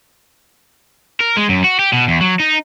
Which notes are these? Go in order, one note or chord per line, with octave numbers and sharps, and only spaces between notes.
A#4
G#3
F#2
F#4
G4
B2
E2
F#3
D#4